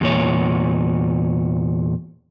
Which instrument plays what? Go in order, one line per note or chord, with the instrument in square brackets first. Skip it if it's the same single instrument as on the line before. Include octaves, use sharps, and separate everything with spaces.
[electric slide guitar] E2 A#2 C#5